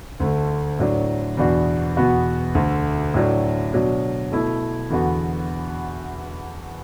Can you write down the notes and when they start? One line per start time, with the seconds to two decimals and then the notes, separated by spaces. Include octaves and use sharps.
0.20 D2 D3 A3
0.79 A2 F#3 D4
1.37 E2 B2 B3 D4 F#4
1.97 E2 B2 B3 F#4
2.55 D2 D3 A3
3.14 A2 F#3 D4
3.73 B2 F#3 D4
4.32 B2 A3 E4
4.90 E2 D3 B3 F#4